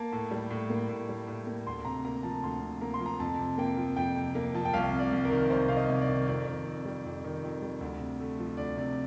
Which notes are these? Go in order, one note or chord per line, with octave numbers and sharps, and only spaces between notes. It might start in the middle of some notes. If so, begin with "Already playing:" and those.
Already playing: A#3 A5
A2
G3
A2
A#3
A2
G3
A2
A#3
D2 C6
C3 A#5
A#3 A#5
F3 A5
D2 C6
C3
A#3 A#5
C6
F3
A#5
F2 A5
C3
A#3 G5
F3
F2 G5
C3
A#3
F3 A5
G5
C2 F5
C3
D5
C2
A#4
D#3
C2 C5
C3 F5
D#5
C2
D5
D#3
F2 D5
D#3
F2
G3
F2
D#3
F2
G3
D2
C3
A3
F3
D2 D5
C3 D5